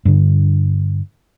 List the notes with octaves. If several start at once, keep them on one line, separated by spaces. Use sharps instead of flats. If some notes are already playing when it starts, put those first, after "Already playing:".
G2 D3